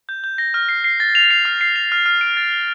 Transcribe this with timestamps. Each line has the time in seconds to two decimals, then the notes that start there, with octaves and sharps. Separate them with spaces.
0.09 G6
0.24 G6
0.38 A#6
0.54 F6
0.69 C7
0.84 C7
1.00 A6
1.15 F7
1.31 C7
1.45 F6
1.61 C7
1.76 F7
1.92 F6
2.06 F6
2.21 D7
2.37 A6
2.52 G7